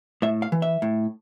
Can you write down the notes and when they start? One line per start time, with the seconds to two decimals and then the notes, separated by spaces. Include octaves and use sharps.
0.22 A2 E5
0.42 F5
0.52 E3
0.62 E5
0.82 A2